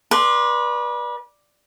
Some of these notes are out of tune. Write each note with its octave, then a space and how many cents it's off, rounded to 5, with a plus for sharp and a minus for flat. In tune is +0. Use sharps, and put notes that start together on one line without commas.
B4 -35 D5 +10 C6 +0